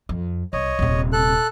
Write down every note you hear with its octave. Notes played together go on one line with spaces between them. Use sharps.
F2
C2 C#5 D#5
D#1 C3
A4 F#6